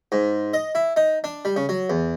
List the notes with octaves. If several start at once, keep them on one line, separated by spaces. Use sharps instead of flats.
G#2
D#5
E4
D#4
D4
G3
C#3
F#3
E2